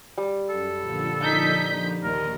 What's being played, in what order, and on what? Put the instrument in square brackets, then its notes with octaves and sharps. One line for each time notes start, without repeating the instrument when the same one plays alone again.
[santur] G3
[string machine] F#2 [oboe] A4
[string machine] A#2 D3 F3
[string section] D#4 G6 B6
[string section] D#2 [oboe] A#4 [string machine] D#5